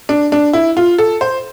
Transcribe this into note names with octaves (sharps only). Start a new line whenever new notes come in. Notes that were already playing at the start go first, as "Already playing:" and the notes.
D4
D4
E4
F4
A4
C5